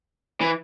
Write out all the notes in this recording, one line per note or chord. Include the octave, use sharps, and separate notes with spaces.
E3